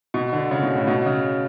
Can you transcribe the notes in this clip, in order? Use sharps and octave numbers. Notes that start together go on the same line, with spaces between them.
B2
D3
C#3
B2
A2
B2
C#3